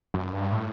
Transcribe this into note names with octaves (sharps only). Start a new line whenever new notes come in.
F#2
G2
A2